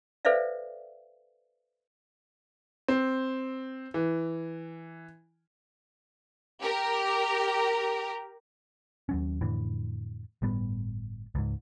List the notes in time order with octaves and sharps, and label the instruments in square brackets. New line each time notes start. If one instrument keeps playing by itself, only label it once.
[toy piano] A4 B4 C5 D5 E5 F5
[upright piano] C4
E3
[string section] G4 A#4
[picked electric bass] D#2 F#3 C#4
F2 A2 D3 E3
G1 A2 G3 B3
C#2 G#2